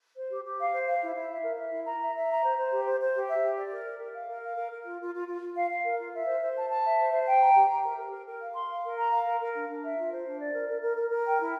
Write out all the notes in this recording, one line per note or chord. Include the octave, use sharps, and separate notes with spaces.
C5
G4
G4
F5
C5
F5
E4
E4
E5
A#4
E5
E4
A#5
E5
E5
A#5
C5
C5
G4
C5
C5
G4
E5
G4
D5
A#4
D5
A#4
F5
A#4
F5
A#4
A#4
F4
F4
F4
F4
F4
F5
F5
A#4
F4
E5
C5
C5
A5
A5
E5
C5
C5
G5
A#5
G4
G4
A#4
A#4
A#4
A#4
F5
C6
F5
A#4
A#5
F5
A#4
A#4
D4
D4
E5
F4
C5
D4
D5
A#4
A#4
A#4
A#4
A#4
G5
E4